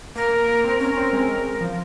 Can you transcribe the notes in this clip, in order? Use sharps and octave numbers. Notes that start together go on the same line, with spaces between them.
A#3 A#4
A#3
C4
C#4 A#4
C4
G#3
F3